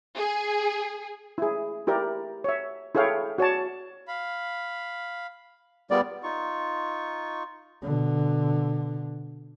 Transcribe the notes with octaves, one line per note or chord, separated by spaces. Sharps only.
G#4
E4 G#4
E4 G4 A#4 D5
C#5 E5
E4 G#4 A4 C#5 F5 G5
F#4 C#5 D5 A5
F5 B5
G3 B3 F4 G#4 A#4 D5
D#4 F4 C#6
B2 D3